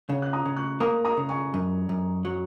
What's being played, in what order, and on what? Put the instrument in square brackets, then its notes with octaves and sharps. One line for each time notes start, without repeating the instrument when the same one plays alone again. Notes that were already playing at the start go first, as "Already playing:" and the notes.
[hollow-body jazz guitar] C#3 [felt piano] C#5 F#5
[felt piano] F#6
A#5 D#6
[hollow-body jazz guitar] C#3
[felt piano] C#6 F#6
[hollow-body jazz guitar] A#3 [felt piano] A#5 D#6
[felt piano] A#5 D#6
[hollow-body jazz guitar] C#3
[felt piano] G#5 C#6
[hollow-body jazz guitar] F#2
F#2
F#3